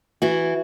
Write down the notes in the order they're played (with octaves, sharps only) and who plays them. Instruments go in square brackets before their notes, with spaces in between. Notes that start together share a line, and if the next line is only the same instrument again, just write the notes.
[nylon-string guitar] E3 F#4